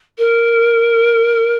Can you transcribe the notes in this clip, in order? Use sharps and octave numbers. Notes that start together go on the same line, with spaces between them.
A#4